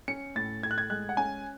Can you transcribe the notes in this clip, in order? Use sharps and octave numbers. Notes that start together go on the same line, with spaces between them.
C#4 C#7
A2 A6
A2 G#6
F#6
G#6
G#3 F#6
F#5
C#4 G#5